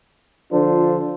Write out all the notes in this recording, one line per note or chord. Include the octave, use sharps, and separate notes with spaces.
D3 F3 D4 F4 A4 C5